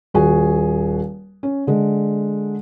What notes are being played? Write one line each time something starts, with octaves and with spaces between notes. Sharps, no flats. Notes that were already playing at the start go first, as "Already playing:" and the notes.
D#1 F#4 G#4 G#5
C#4
D3 G#3